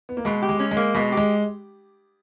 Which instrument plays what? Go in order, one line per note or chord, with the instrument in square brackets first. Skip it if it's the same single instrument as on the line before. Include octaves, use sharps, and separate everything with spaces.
[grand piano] B3
A#3
[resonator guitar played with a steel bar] B2 [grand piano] G#3
[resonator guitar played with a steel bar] G4
[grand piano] G#3
[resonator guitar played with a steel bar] C#4
[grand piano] G#3
[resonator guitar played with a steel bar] A#3
[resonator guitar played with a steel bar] B2 [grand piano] G#3
[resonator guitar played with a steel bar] G4
[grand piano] G#3